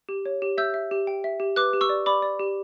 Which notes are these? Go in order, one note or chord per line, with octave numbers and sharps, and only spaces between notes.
G4
C#5
G4
E5 E6 G6
E5
G4
G5
E5
G4
B4 D6 F#6
G4
C#6 E6
D5
D5 B5 D6
D5
G4